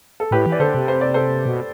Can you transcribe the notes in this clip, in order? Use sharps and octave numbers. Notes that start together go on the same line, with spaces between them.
A4
A2 G4 B4
E3
D5
D3 A4 C5
C3
C5
D5
A4 C5
B2